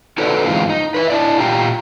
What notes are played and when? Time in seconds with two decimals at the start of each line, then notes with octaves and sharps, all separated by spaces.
0.18 D#4 F#4 A4 B4 C#5 D5
0.46 F#2 D3 E3 G#3 C4 F4
0.69 D#4
0.94 B4 C#5 E5
1.10 D4 E4 D5
1.39 A#2 F4 G4 G5 A#5